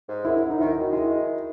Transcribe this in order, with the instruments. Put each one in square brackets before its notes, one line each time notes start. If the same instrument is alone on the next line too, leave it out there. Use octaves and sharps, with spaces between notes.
[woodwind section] G#2
[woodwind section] F#2 [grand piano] E4
[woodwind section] F#2
[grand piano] D#4
[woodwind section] D#3 [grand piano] E4
[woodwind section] D#3
[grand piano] F#4
[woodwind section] G#3 [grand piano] E4
[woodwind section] D#3